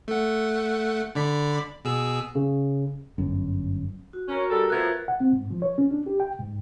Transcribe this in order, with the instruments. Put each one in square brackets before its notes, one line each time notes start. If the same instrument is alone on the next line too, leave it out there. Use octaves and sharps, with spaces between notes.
[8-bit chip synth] A3 F#5
D3 D5 B5
B2 G#4 E6
[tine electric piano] C#3
[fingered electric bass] G1 F#2
[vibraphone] F#4
[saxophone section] C#4 [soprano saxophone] A#4
[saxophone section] G3 A4
[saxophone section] F3 A3 B3 [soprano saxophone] A#4 [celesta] F#6 G#6
[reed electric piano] F#5
C4
G#2
F3
C#5
C#4
D4
G4
G5
G#2